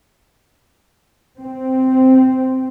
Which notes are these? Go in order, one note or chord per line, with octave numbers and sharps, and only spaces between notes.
C4